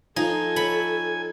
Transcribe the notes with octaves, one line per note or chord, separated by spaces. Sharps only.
F3 D#4 A4 G#5
C#5 B5